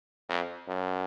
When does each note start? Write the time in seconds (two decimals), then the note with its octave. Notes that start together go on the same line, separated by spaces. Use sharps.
0.29 F2
0.68 F#2